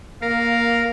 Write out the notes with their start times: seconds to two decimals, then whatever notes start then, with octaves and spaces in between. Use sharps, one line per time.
0.22 A#3 A#4 F5